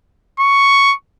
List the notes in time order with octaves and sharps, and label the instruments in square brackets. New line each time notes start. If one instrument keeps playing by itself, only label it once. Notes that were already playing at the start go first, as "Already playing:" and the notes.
[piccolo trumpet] C#6